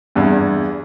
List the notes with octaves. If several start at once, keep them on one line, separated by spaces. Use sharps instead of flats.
E2 G2